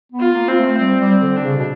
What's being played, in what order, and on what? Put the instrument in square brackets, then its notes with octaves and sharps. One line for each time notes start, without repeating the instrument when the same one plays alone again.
[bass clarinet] B3
[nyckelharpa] F4
[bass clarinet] A#3
[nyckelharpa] C4
[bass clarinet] A3
[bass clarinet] G3 [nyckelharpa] C4
[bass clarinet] G3
[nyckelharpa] C4
[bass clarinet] D3
[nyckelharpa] D4
[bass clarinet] C#3
B2